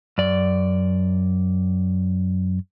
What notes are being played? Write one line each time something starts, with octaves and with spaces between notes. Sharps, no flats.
F#2 D5